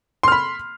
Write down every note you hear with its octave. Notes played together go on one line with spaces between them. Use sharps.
B5 C6 F6